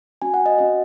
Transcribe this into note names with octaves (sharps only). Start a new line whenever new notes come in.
C#4 F#4 G#5
F#5
D#5
C#4 F#4 D#5